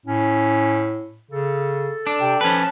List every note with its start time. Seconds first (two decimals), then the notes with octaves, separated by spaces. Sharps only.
0.06 A2 C#4
1.31 C#3 A4
2.07 D4 A5
2.20 C3 G5
2.41 F3 C#4 B4 A5